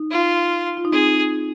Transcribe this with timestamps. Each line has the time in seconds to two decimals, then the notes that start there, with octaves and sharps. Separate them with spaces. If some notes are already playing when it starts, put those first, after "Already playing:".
Already playing: D#4
0.11 F4
0.77 F4
0.85 D#4
0.92 C4 G#4